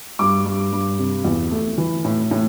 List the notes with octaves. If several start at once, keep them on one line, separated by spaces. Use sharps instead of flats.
G2 D6
G2
G2
C3
E2
A3
E3
A2
A2